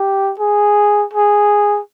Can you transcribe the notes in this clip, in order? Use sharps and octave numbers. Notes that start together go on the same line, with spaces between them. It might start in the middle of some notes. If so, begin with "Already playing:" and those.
Already playing: G4
G#4
G#4